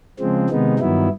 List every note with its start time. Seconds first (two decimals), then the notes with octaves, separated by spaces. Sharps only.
0.19 C#3 F3 G#3 C4
0.50 C3 D#3 G#3 B3 D#4
0.79 G2 D#3 F#3 B3 E4